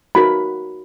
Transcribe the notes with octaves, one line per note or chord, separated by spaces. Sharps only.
D#4 F#4 A#4 B5